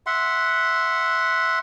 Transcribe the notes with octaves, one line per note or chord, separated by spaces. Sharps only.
E5 F#5 C6